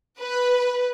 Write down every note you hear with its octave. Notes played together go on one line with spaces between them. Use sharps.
B4